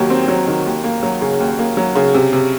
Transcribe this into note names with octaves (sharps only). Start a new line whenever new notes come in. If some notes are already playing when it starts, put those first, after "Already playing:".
Already playing: D#2 D#3 F#3
C4
F#3
D#3
D#2
A#3
F#3
C#3
D#2
A#3
F#3
C#3
C3
C3